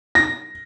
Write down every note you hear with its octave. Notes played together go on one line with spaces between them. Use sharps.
A#6